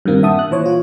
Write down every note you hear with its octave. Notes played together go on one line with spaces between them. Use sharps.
G2 A#2 D#3 A#3 C4
E5 F#5 A5 D#6
F#6
A#2 E3 C5 C#5
F4